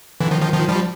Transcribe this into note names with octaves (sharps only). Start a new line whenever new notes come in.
D3 E3
D#3 F3
D#3 F3
D#3 F3
F3 G3